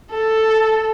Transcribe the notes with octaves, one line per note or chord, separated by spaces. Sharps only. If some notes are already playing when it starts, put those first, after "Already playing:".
A4